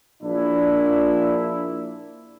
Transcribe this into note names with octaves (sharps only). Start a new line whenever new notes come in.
A#1 A#2 D4 E4